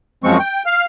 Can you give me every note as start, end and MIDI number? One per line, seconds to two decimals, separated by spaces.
0.24 0.38 42
0.24 0.38 53
0.24 0.38 56
0.24 0.38 60
0.24 0.38 85
0.39 0.63 79
0.66 0.85 77
0.66 0.85 89